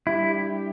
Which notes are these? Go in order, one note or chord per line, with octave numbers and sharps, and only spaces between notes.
G3 D4 E4 G4